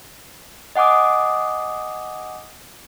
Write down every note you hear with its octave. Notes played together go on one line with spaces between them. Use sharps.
D#5 F#5 G#5 D6 D#6